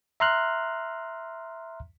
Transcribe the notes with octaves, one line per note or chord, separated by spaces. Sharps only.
E5 A#5 C6 F6 F#6